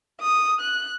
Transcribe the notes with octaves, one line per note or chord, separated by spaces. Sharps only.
D#6
F#6